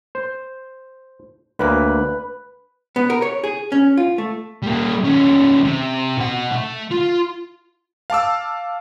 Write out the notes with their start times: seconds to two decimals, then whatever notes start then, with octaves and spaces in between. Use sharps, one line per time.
0.15 C5
1.59 D2 A#3 B4 B5
2.96 B3
3.10 A#4
3.22 C#5
3.44 G#4
3.72 C#4
3.97 F4
4.18 A3
4.63 G3 A#3
5.05 D#2 C#4
5.63 C3
6.17 B2 F#5
6.51 A3
6.91 F4
8.10 F5 A5 D6 E6